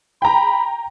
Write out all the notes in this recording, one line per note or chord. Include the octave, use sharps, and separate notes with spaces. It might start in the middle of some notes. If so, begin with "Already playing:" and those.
G5 A#5 B5